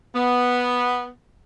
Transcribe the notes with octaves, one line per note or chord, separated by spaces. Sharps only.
B3